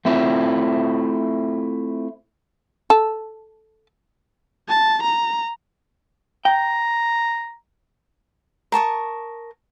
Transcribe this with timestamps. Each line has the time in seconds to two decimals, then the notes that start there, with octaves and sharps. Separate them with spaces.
0.05 A3 C4 E4 F4 C5
2.90 A4
4.69 A5
5.03 A#5
6.45 G5 A#5
8.72 A#4 A5 C#6 D#6